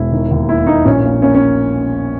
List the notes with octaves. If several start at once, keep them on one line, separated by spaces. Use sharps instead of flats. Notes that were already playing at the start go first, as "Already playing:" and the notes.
Already playing: E1 E4
D#3
D#2
A#3 E4
A#3 D#4
A#1 C#4
A#3
A#3 C#4
C#4